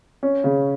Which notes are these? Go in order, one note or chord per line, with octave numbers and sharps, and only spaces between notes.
C#4
C#3